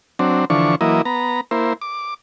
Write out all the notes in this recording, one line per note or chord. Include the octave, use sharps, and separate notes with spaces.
F#3 C4 D4
D3 E3 F3 D4 C#6
E3 F#3 A#3 E4 D#5
B3 A#5
A#3 E4 C5
D6